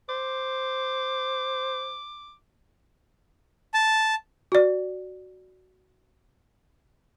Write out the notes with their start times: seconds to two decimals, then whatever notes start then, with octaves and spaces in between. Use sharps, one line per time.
0.09 C5 D6
3.74 A5
4.52 F#4 D5